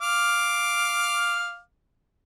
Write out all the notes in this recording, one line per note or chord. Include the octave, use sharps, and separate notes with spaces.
F5 D6 F6